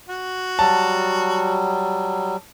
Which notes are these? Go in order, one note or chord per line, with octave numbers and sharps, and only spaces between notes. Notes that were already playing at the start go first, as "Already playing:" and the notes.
F#4
F#3 G3 A5